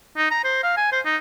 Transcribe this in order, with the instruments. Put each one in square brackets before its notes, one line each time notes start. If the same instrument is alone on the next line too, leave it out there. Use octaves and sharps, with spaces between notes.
[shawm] D#4
A#5
C5
F5
G#5
C5
D#4